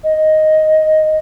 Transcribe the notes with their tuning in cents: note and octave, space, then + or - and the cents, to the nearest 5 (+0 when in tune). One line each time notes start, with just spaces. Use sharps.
D#5 +0